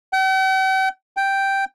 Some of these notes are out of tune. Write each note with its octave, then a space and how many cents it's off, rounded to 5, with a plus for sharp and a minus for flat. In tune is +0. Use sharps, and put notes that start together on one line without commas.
G5 -45
G5 +0